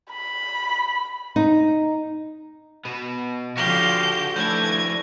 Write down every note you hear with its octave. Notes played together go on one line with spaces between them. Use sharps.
B5
D#4
B2 B3
D3 F3 F#4 G4 F5 C#6 G6 A#6
F3 A3 D4 E4 G6 G#6